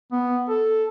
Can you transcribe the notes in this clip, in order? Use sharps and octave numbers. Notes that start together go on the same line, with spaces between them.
B3
A4